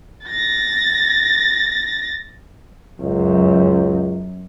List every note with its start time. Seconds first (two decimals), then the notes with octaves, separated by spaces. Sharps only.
0.25 A6 A#6
3.00 C#2 F#2